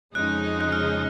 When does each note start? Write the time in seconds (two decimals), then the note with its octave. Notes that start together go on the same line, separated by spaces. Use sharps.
0.15 F2 C#3 G#3 D#4 F#6
0.61 F#6
0.72 F6